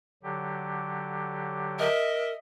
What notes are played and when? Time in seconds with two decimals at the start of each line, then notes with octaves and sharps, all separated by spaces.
0.23 D3 F#3 G4
1.79 A#4 D#5 E5